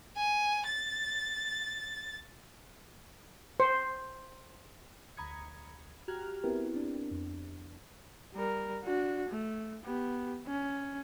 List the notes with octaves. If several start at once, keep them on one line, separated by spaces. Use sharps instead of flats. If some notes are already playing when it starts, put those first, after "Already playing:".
G#5
A6
C5
D2 A#5 B5 D#6 G#6 C#7
F#4 G4 A#5 F6 F#6 G#6
B3 C4 E4 G4 A#4
C4 D4
F2
G3 A#4
D4 F#4
A3
B3 G4
C#4